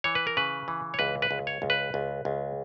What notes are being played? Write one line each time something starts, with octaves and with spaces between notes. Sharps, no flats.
E3 C#5
B4
A#4
C#3 B4
E3
C#5
C#2 B4
B4
C#2
C#5
C#2
B4
C#2
C#2